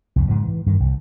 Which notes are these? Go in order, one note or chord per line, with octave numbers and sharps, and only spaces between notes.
C2 F2
G#2 C#3 F3
E3
G2 D#3
C2